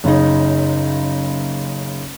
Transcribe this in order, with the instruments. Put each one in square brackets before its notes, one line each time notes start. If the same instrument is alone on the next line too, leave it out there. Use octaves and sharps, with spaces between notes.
[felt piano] F#1 C#3 D#4